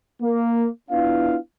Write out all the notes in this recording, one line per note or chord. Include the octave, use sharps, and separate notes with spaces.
A#3
B3 D4 E4 F4 F5